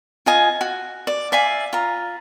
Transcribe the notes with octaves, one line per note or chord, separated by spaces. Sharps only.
F4 D#5 G#5
F#4
D5
D5 E5 F5 G#5
F4 A#5